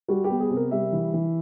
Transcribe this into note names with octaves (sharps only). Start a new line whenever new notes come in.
G3 F#4
G4
B3
G#4
C3
A#4
G3 E5
E3
E3